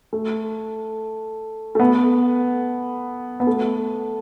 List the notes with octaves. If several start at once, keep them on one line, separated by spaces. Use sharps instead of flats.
A3
A3
B3
B3
A3